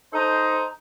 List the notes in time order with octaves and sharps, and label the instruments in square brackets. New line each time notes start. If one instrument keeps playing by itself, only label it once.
[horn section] D#4 A4 C5